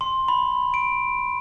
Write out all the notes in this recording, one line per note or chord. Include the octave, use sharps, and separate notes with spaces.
C6
B5
D7